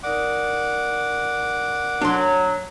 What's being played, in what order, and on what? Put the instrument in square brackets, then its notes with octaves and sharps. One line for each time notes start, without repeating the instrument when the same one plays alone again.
[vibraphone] D#4 A#4 D5 [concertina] F#5 D6
[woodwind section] F#3 [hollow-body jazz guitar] D4 C6